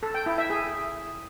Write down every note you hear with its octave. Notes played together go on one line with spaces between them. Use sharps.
A4
G5
E4
E5
G#4